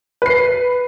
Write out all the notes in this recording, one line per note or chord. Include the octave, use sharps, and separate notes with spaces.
B4 C7